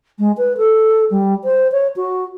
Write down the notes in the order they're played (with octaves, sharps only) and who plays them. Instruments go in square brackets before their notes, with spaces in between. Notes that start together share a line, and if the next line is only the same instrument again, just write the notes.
[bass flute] G#3
B4
A4
G3
C5
C#5
F#4